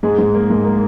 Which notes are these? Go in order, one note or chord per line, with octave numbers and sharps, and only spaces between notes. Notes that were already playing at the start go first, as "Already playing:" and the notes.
G#2 G#3 G#4
G#2
A#3
G#2
A#3